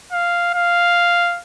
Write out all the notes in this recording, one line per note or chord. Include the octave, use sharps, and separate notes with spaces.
F5
F5